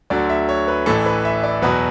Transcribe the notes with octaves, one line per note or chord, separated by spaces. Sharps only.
D2 D3 F#3 D5
E5
C#5
B4
A1 A2 E3 A4
B4
E5
D5
E2 B2 F#3 B4